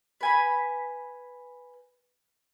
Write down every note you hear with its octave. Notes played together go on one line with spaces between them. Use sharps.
B4 G#5 B5